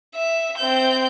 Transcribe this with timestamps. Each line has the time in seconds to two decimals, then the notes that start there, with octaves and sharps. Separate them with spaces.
0.15 E5
0.58 C4 G6